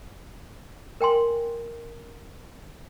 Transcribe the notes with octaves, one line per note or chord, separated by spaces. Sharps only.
A#4 G5 G#5 C6